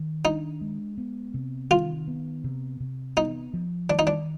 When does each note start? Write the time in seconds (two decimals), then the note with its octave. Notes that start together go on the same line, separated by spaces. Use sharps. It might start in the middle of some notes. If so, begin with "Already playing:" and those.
Already playing: D#3
0.25 D4 D#4
0.61 G#3
0.98 B3
1.34 C3
1.71 D#3 F4
2.08 B3
2.44 C3
2.80 C3
3.17 B3 D#4
3.54 F3
3.90 D#3 D4
3.99 D#4
4.07 D4